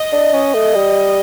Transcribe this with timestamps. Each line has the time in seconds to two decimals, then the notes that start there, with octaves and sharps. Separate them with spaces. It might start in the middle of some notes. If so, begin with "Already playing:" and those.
Already playing: D#5
0.12 D4
0.33 C#4
0.54 A3
0.74 G3